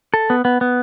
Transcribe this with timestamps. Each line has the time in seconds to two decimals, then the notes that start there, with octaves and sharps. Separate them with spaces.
0.14 A4
0.30 B3
0.45 B3
0.61 B3